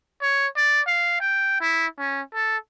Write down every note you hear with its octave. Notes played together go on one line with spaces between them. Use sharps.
C#5
D5
F5
G5
E4
C#4
A4